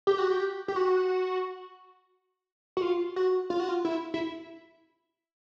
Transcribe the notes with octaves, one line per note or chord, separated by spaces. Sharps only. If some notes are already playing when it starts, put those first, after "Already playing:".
G4
F#4
G4
G4
F#4
F#4
F4
F#4
F4
F#4
F4
E4
E4